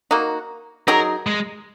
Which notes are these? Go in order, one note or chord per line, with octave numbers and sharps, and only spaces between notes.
A#3 D#4 F#4
F#3 D#4 G#4 A#4
G#3